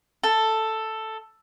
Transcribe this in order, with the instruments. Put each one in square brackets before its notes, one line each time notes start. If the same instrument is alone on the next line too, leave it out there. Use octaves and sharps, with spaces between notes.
[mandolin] A4